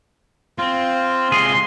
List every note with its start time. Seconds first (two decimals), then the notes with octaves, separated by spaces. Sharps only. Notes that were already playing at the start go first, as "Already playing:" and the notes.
0.58 C4 F4
1.32 C3 G#3 G#4 C6